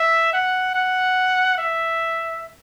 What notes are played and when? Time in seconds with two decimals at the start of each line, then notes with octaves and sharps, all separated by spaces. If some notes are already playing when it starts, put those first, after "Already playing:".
Already playing: E5
0.33 F#5
0.75 F#5
1.58 E5